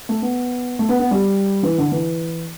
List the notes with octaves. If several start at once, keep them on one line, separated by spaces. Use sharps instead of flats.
A3
B3
A3
B3
B3
G3
E3
D3
E3